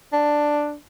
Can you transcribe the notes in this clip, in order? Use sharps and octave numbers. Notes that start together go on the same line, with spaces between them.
D4